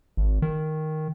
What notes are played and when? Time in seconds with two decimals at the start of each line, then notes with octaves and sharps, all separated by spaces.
0.17 G#1
0.42 D#3